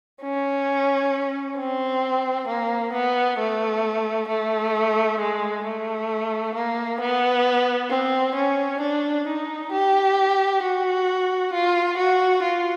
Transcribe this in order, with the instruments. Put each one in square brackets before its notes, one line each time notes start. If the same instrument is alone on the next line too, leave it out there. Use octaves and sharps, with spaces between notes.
[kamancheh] C#4
C4
A#3
B3
A3
A3
G#3
A3
A#3
B3
C4
C#4
D4
D#4
G4
F#4
F4
F#4
F4